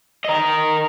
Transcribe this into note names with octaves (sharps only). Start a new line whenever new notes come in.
A#4 D#5